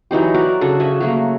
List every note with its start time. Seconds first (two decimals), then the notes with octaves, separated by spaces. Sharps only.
0.11 E3 F#3 D#4 G4
0.34 F#4 A#4 D5
0.61 C#3 D4 F#4 A4
0.80 C#3 F#4 E5 G#5
1.00 F#3 A3 A#3